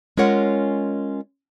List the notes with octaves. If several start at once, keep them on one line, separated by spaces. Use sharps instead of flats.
G#3 C#4 F4 A#4 C#5 F#5